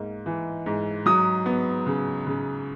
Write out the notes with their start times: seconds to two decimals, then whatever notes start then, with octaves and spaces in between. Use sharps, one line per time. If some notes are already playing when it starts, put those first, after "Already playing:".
Already playing: G#2 A#3
0.26 E3
0.66 G#2
1.06 F#3 D#6
1.46 B3
1.87 C#3
2.27 C#3